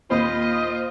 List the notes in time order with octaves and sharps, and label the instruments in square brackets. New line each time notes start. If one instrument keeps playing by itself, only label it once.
[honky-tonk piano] D#2 A#2 B5 [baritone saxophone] F4 [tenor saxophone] C5 [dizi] D#5